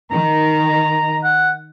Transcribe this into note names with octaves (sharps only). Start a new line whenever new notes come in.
D#3 A#5
F#5